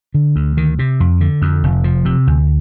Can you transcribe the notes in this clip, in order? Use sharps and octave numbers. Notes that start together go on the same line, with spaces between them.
D3
D2
D#3
C3
F2
D3
F2
F1
F3
C3
D2